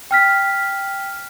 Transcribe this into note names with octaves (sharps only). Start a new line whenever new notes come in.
G5 F6 B6